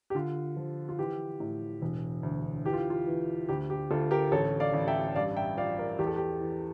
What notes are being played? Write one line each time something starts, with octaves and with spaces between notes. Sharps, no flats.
G4
D3 F4
F3
F4
E3 G4
A2
E1
D2
E3 G4
F4
F4
E3
D2 G4
G4
D2 F4 A4
G4 A#4
A1 A4 C#5
D5 F5
A1
E5 G5
G2 D5 F5
E5 G5
F3 D5 F5
A#4 D5
E2 G4
A4
G4
E3